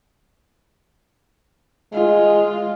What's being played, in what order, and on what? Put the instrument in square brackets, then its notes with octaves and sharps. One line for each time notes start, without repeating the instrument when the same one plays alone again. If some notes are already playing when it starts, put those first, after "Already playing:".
[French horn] G#3 [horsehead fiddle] F4